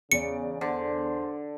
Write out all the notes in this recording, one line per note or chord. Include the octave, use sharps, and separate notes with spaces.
E2 C#3 D5 C#7 D7
D3 C5